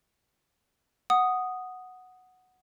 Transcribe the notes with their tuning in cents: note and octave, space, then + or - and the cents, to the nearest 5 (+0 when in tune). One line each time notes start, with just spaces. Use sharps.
F#5 +0 D#6 +0